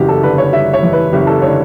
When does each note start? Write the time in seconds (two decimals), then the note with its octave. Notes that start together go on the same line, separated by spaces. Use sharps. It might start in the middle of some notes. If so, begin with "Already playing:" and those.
Already playing: F#1 E2 G3 F#4 G4
0.08 A4
0.23 D3 B4
0.38 C#5
0.52 G3 E5
0.73 C#5
0.83 E2
0.93 B4
1.12 F#1 G4
1.27 A4
1.42 D3 C#5